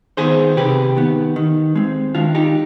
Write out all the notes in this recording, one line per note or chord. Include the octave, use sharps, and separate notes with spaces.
D#3 B3 G#4 C5
C3 G4 B4
D#3 B3
D#3
G#3 C4
D#3 D4 F4
D#4 G4